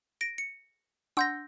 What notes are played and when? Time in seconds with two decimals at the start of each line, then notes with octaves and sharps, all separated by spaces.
0.21 A#6 D7
0.38 C#7
1.17 D4 F#5 C6 E6 G6 A#6